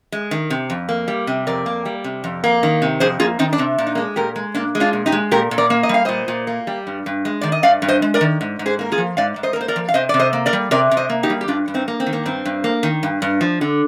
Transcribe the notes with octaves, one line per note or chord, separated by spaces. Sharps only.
G#3
D#3
C3
F2
A#3
G3
C3
F2 A#4 D5
A#3
G3
C3
F2
A#3
D#3
C3
F2 G#4 C5
A#3 F4 G#4
D#3 C4 D#4
D4
C3 C4
A#2 D4
D#4
G#3 A#3 D4
A#2 G4 A#4
G#3
A#2 A#3 D4
G#3
D4 F4
A#2
D#4 G4
G#3
A#2 G4 A#4
A#2
A#4 D5
A#3
D#5
G3 F5
A#2 C5 D#5
A#2
A#3
G3
G2
G2
G#3
D#3 D5
D#5
G2 D5 F5
G2
C5 D#5
G#3
A#4 D5
D#3
G#2
G#2
G#4 C5
A#3 A#4
F4 G#4
F3
G#2 D5 F5
G#2
C5 D#5
A#4
A#3 C5
A#4 D5
F3
F5
C3 C5 D#5
C3 D5
C5 D#5
A#3
A#4 D5
G3
C3 A#4 D5
C3
C5 D#5
A#3
D#4 G4
G3
G4
G2 D4 F4
G2
C4 D#4
A#3
C4
D#3
A#3
G2 C4
G2
A#3
D#3
G2
G2
F3
D3